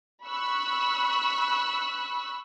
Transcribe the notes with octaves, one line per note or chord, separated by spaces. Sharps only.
B5 C#6 E6 F#6